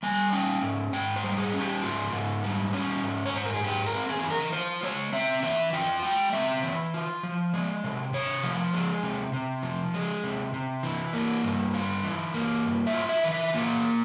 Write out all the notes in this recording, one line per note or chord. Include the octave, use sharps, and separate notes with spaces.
G3 G#5
C#4 G5
G#2
G#2 G5
C5
G3
G#4
C#4
G4
G#2 F4
G#2
G3
C#4
G#2
C#5
G#2 C5
A#4
G#4
G#3 G4
A#4
C4
G#4
E3 G#4
A#4
F4 C5
G#3 C#5
C4 E5
E3 E5
F4 G5
G#3 G5
C4 E5
E3
F4
F3
G#3
C3
C3 C#5
F3
G#3
C3
C3
F3
G#3
C3
C3
E3
A#3
G2
F4
E3
A#3
G2
E5
F4
E5
E3
E5
A#3 F4